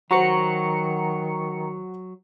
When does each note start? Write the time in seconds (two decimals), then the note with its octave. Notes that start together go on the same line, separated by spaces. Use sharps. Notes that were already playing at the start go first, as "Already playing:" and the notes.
0.11 D#3 F#3 F#4 C5 A#5 C#6 C#7